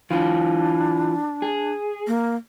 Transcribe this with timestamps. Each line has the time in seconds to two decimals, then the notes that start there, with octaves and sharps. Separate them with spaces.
0.11 E3 D4 F4
1.42 G#4
2.07 A#3